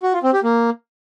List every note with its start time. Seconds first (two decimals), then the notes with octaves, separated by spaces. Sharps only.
0.03 F#4
0.13 F4
0.23 C4
0.33 G4
0.43 A#3